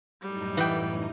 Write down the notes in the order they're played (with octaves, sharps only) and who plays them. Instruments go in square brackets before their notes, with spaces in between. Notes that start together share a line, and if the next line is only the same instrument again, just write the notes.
[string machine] F#2 A2 D#4 [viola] G3
[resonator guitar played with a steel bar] E3 [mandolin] B3 G5